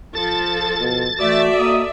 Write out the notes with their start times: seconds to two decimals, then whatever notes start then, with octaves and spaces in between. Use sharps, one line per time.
0.15 F3 A4 A6
0.80 B2
1.19 E3 A3 F#4 A4 D5 E5
1.59 A#3 D#5 D#6